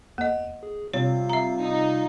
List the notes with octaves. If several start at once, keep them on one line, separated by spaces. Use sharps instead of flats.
E2 A#3 D#5
G#4
C3 G3 F4 C#5 F5
E5 A#5
D#4